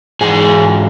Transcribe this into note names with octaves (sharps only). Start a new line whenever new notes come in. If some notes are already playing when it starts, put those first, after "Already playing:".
G#2 E3 G#4